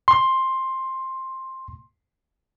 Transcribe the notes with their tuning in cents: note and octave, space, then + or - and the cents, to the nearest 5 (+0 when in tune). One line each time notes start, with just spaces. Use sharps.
C6 +10